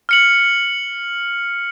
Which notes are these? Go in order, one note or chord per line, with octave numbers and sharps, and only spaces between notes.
F6 C#7 F#7